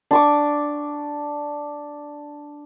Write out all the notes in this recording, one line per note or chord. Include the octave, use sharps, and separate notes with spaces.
D4 C#6 D6